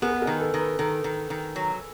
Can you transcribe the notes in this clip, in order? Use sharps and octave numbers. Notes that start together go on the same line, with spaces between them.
B3 G#4 A#4
B4
G#4 A#4
D#3
A4 B4
D#3
A4 B4
D#3 A4 B4
D#3
D#3
F#3